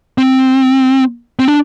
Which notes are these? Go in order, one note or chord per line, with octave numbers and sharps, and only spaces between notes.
C4
C4
D4